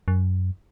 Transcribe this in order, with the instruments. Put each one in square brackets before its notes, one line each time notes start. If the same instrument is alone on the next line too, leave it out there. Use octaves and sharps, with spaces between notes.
[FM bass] F#2